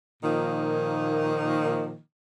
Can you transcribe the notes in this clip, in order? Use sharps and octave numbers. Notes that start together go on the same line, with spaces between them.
A#2 D#3 F3 A#3 D#4